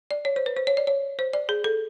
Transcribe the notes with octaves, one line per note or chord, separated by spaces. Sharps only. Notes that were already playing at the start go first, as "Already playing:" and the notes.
D5
C#5
C5
B4
C5
C#5
D5
C#5
C5
D5
G#4
A4